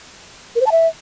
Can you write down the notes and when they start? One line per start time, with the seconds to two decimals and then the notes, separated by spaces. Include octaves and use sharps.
0.55 A#4
0.61 C5
0.66 A5
0.72 E5